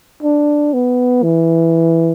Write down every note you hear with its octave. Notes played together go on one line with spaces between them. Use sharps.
D4
B3
E3